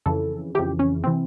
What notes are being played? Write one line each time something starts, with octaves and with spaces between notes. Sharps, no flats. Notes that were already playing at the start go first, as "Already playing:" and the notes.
F2 C#3 E3 A4
F2 C#3 E3 G4
C#4
C3 E3 C4